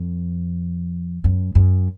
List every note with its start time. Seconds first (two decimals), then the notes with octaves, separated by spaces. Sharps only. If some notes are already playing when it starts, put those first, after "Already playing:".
Already playing: F2
1.24 F#2
1.55 F#2